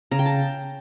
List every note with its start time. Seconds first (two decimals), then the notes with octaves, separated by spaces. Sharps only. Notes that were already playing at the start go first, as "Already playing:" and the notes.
0.11 C#3 A#5
0.19 G5
0.26 A5